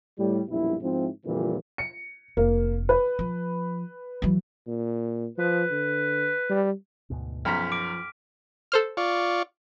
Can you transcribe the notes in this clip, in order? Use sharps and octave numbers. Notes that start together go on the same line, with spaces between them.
A2 G3
A#1 F#2 B2 G3 E4
G#2 F3 C4 E4
F2 A#2 D3 E3 F3 G3
C#7
F1 A#3
B4
F3
E3 F#3
A#2
F3 B4
D3
G3
D2 G#2 B2
B1 F#2 F3 A#5 F6 B6
D6 D7
A4 C5 F6
F4 D5 C#6